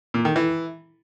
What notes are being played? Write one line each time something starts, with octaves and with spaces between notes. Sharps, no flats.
A#2
D#3
E3